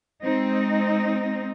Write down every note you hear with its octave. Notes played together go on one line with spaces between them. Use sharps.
G#3 C4 D#4